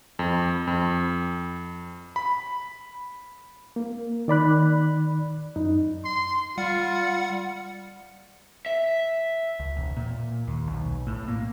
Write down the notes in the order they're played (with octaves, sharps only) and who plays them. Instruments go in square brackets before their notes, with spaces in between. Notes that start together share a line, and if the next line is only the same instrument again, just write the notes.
[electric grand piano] F2
F2
B5
[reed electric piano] A#3
D#3 D5 B5 F#6
F#2 D#4
[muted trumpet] C6
[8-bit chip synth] G3 F#5 C#7 [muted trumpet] F4
[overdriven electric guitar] E5
[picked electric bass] C#2
E1
A#2
D#2
B1
A2
A#3